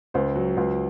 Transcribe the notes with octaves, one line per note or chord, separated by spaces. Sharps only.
C#2 C5
F#3
C#2